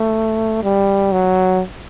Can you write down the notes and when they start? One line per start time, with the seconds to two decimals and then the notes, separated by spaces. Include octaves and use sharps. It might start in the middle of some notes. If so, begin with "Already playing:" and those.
Already playing: A3
0.64 G3
1.12 F#3